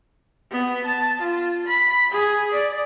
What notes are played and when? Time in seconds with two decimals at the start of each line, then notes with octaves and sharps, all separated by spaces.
0.51 B3
0.86 A5
1.21 F4
1.66 B5
2.12 G#4
2.54 D5